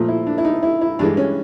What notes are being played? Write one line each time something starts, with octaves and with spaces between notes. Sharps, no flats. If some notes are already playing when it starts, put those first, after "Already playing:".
Already playing: A#2 F3 A3
E4
D4
E4
D#4
E4
E4
G2 E3 G#3 D4
C#4